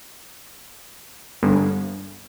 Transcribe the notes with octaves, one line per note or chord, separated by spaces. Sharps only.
G1